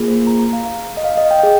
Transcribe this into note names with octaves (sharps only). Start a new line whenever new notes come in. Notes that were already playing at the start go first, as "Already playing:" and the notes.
Already playing: A#3 F4 G#4
C5
A#5
A#5
F5
F5
D#5
F5
D#5
G5
G#4